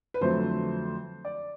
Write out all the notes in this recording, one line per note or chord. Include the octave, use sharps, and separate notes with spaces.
B4
F2 D3 F#3 A3 C5
D5